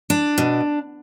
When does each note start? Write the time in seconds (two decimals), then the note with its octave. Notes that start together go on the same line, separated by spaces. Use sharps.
0.10 D4
0.38 B2